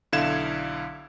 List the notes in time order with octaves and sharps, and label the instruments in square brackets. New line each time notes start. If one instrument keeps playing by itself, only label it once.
[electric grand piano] B1 D3 E4 F5 G#6 E7